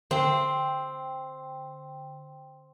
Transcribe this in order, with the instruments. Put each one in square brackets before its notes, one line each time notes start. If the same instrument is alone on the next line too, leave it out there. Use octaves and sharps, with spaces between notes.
[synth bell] D3 G5 [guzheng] C4